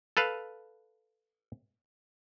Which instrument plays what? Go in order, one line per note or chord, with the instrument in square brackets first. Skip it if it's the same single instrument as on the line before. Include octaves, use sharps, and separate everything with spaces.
[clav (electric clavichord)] A4 B4 F5